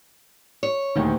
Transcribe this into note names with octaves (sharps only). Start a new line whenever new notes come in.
C#5
D#1 D2 D#3